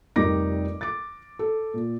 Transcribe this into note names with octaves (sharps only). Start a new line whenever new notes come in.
F1 G3 D#4 A#4 D6 A#6
D6 A6
A4
A#2